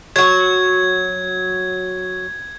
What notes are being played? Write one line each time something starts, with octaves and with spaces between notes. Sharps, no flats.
F#3 F#4 G#6